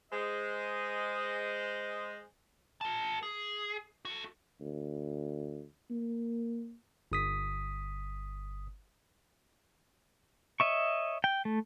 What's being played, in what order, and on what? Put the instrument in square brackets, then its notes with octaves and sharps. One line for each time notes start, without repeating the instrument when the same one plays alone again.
[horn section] G#3 C5 D#5
[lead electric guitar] A#4 A5
G#4
F#4 A4
[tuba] D2
A#3
[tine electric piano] G1 D#6 B6
[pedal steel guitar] C#5 D#5 E5 C#6
G5
A3